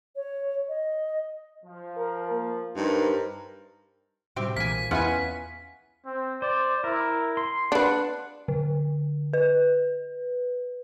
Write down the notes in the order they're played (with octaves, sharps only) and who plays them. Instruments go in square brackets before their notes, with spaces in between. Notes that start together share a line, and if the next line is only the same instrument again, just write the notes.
[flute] C#5
D#5
[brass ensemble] F3
[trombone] A#4
A#3
[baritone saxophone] G2 [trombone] D#4 [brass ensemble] A#4 C5
[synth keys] A2 C3 G3 [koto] C4 G4 E5
[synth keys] B1 A#2 E3 [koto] A#3 G#5 [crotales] B6
[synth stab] E2 E4 G#5 [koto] B3 C#4 F4 [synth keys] C#7
[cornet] C4
[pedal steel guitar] C5 [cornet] D5
[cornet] E4 [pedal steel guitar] A#4
[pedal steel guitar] C6
[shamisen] D4 B4 [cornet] F#5
[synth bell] D3
B4